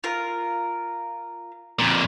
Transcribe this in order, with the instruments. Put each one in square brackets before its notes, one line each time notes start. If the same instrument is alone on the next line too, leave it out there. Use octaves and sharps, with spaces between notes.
[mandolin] F4 A#4
[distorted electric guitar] F2 A#2